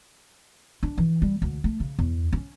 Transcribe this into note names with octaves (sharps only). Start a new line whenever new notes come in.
D4
E3
G3
D2
A3
C#3
E2
C#4